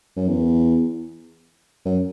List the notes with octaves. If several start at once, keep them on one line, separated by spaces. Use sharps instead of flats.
F#2
E2
F#2